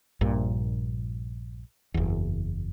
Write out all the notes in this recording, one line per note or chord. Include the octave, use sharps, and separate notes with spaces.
A#1 G2 A#2
F#1 E2